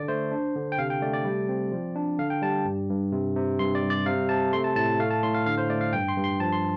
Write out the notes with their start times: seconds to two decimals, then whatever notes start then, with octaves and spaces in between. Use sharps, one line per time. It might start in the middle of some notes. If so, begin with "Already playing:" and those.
Already playing: D3 D5
0.08 A3 C5
0.31 D4
0.56 D3
0.72 G5
0.78 C3 F5
0.90 G5
1.02 A3 D5
1.13 D5
1.25 G3
1.49 C4
1.72 F3
1.96 D4
2.19 D3 F5
2.30 G5
2.42 G3 A5
2.65 G2
2.89 G2
3.13 C3
3.36 C3
3.59 G2 C6
3.75 D5
3.82 G3
3.90 D5
4.06 C3 F5
4.29 C3 A5
4.53 A3 C6
4.64 A5
4.76 A2 A5
4.99 A3 F5
5.11 A5
5.23 A2 C6
5.34 F5
5.46 D3 F5
5.58 C5
5.70 A3 D5
5.81 F5
5.93 G2 G5
6.08 C6
6.16 G2
6.24 C6
6.40 F3 A5
6.52 C6